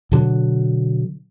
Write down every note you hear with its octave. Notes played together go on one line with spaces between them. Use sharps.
B2 D3 F#3